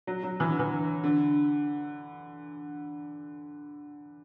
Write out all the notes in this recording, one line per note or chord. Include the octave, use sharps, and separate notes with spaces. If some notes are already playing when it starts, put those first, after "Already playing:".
F#3
F#3
E3
D3
E3
D3